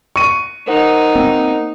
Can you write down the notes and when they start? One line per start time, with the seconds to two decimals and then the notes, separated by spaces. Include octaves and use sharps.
0.16 C#6 D#7
0.67 D#4 A#4 C5 F#5
1.16 A#3 C4